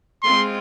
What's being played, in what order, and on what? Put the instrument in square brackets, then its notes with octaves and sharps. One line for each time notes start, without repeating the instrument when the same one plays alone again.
[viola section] G#3 C4 F4 [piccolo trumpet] C6